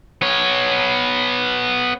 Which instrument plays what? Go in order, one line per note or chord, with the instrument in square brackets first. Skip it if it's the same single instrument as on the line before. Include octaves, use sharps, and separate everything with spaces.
[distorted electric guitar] B3 C#5